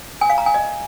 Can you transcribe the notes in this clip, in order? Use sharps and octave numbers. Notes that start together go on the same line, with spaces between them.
G#5
F5
A#5
G#5
D#5